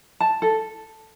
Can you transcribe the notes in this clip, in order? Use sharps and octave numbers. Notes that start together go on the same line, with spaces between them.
A5
A4